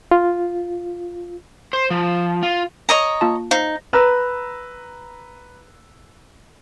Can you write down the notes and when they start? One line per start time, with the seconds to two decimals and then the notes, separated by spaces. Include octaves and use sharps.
0.11 F4
1.73 C5
1.90 F3
2.43 F4
2.89 C#5 D#5 A#5
3.21 A#3 F4 A5
3.51 D#4 C5 F5
3.93 B4 A#5 E6